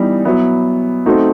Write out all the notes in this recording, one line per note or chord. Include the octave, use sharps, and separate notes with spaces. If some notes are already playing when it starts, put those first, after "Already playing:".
Already playing: E3 G3 B3 D#4
F#3 B3 E4
A3 C4 D#4 F#4